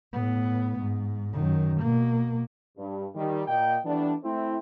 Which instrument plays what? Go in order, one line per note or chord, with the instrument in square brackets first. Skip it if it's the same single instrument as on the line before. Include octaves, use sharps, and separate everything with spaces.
[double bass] A2 B3
G#2
F#2 D#3
B2 A#3
[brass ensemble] G2
D#3 G3
A#2 A#3 D#5 G5
E3 G3 A3 B3 D4
A3 C4 E4